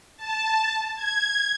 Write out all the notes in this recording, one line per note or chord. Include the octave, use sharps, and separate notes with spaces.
A5
G#6